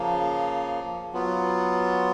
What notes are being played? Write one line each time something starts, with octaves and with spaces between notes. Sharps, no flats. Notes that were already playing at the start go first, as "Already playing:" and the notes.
Already playing: C#3 F3 A#3
F#3 B3 F4